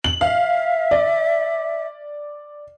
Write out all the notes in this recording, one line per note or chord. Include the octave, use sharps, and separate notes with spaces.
F#7
E5 F5
D5